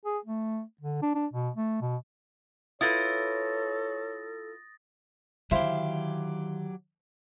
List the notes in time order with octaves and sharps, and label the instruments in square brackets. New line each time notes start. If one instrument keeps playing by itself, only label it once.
[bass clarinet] G#4
A3
D3
D4
D4
B2
A3
B2
[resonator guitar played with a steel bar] E4 F4 B4 [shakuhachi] A4 [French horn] C#5 [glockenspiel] D#6 A6 A#6
[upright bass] D3 D#3 [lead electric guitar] F#3 G4 [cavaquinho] E4 C5 F5